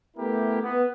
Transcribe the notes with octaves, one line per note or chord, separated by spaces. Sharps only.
A3 B3 E4 G4 A#4
B3